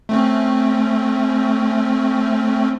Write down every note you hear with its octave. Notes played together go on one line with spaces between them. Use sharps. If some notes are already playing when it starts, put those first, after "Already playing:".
A3 C4 C#4